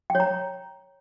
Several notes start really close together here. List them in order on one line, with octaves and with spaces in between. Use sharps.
G5 C#5 A#5